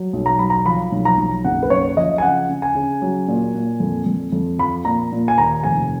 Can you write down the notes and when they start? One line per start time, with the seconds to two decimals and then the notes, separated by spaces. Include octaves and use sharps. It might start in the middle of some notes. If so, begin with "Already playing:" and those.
Already playing: F#3
0.13 B1
0.26 A#5
0.39 F#3 B5
0.50 A#5
0.66 F3 B5
0.92 B1
1.05 A#5
1.17 B1
1.45 F#1 F#5
1.63 B4
1.70 F#2 C#5
1.97 F3 D#5
2.18 G#5
2.22 C#3 F#5
2.49 C#3
2.62 G#5
2.75 C#3
3.02 F#3
3.28 A#2
3.55 A#2
3.80 F2
4.06 F2
4.32 F2
4.58 F3 B5
4.85 A#2 A#5
5.12 A#2
5.28 G#5
5.38 D#2 A#5
5.64 F1 G#5